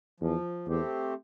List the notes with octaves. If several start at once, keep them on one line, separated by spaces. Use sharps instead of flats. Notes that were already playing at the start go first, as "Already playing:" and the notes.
E2 F3
E2 A3 C4 G4